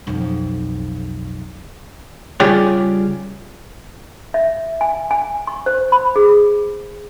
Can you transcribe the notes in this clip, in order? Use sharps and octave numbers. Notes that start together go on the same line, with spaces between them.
B1 F2
C#3 G3 F4 G4 G#4 C#5
E5
G#5
G#5
C#6
C5
B5
G#4